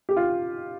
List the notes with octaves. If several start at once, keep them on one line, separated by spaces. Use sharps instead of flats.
G4
F4